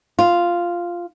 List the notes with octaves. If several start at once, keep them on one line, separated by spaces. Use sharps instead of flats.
F4